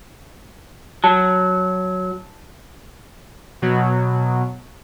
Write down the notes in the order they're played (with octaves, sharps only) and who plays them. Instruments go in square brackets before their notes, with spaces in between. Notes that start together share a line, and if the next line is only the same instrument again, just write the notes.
[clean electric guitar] F#3 [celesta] A5
[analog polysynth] B2 F#3